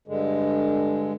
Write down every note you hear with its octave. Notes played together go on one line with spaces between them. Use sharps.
G2 D3 G#3